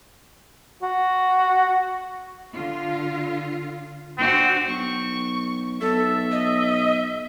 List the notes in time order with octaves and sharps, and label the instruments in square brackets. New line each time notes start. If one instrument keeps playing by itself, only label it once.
[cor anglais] F#4
[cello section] D3 F4
[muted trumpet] C4 [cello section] D4 F#4 C5
[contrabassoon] B1 [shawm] C#6
[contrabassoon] B1 [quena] A4 [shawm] E5
[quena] D#5